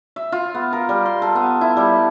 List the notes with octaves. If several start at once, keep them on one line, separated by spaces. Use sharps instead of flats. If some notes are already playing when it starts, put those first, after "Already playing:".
E5
F4
B3
A#4
G3
C6
A4
B3
E4
G3